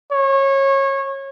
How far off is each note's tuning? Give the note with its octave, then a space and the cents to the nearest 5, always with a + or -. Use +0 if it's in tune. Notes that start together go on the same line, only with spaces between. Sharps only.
C#5 -25